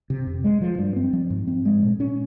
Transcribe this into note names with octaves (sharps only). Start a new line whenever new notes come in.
C3
F2
G#3
F3
G2
C4
F3
G#2
C4
G#3
A#2
C#4